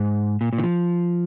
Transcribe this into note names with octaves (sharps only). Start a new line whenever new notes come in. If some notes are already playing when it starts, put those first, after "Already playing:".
Already playing: G#2
A#2
A#2
D#3
F3